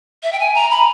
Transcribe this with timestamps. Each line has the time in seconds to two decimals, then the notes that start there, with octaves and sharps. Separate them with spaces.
0.23 E5
0.32 G5
0.39 G#5
0.55 A#5
0.71 B5